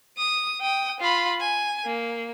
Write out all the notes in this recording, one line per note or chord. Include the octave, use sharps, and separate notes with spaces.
D#6
G5 D#6
F4 B5
G#5
A#3